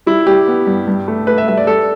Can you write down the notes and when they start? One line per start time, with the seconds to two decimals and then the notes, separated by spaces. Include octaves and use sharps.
0.06 G3 E4
0.27 G3 G4
0.48 B3
0.67 G2
0.87 G2
1.08 A3
1.27 A3 B4
1.38 E5
1.48 G2 E5
1.58 D5
1.67 G3 A4